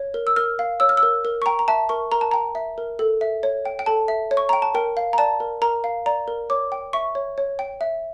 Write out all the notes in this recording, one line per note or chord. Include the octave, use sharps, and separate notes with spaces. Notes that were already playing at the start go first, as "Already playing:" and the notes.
Already playing: C#5
A#4
E6
A#4 F6
F5
C#5 E6
F6
E6
A#4
A#4
C#6
G5 A#5
A#5
E5 A5
A#4 C#6
A#4 A#5
A5
G5 A#5
E5
A#4
A4
E5
C#5
G5
G5
A4 A5
E5
C#5
C#6
G5 A#5
A5
A#4 G5
F5
A#5
D5 A5
A#4
A#4 A#5
F5
D5 A#5
A#4
C#5 D6
G5
E5 C#6
C#5
C#5
G5
E5